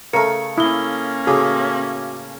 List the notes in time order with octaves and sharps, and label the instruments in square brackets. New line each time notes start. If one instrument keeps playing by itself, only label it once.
[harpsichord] C#3 A3 [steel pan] A#4 [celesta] C#7
[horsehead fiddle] A#3 C#4 [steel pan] E4 [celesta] D#6 G7
[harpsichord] A2 C#3 [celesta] F#4 F5 D6 [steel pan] G#4